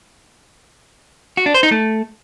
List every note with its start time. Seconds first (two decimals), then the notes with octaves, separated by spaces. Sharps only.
1.37 F#4
1.46 D4
1.54 C5
1.63 D#4
1.71 A3